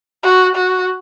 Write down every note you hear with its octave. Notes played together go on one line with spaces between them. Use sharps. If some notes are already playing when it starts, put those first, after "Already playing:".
F#4
F#4